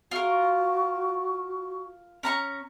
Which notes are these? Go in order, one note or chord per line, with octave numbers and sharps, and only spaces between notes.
F4 F#4 A#4
C#4 A#5 C#6